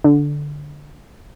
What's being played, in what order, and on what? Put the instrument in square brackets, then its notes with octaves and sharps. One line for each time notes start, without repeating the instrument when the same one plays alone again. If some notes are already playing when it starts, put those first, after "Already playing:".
[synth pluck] D3